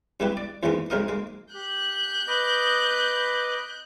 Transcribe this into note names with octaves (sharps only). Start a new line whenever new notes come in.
G2 G#3 B3 E4 G4 B4
D5
E2 G#2 E3 G#3 A#3 B3
B1 G#2 D#4 A#4 D#5
G#3 A#3
G4 F#6 G6
B4 D#5 D6